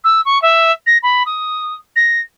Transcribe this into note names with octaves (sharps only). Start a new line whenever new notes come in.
E6
C#6
E5
A#6
B5
D#6
A#6